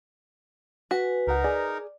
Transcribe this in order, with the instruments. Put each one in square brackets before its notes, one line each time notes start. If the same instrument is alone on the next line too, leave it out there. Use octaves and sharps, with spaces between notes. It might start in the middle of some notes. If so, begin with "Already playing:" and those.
[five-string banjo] F#4 [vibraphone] B4 G#5
[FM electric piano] C#2 F#5 [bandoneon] D#4 A#4
[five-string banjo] G#4 [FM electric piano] D5